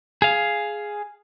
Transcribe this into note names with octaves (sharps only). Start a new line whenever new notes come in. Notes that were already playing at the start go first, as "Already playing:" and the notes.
G#4 F5